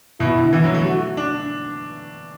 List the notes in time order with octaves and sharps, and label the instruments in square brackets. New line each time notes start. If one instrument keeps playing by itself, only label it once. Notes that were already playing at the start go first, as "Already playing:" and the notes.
[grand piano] B2 [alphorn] E4
[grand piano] D3
E3
F#3
A3
[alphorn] F#4
[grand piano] D4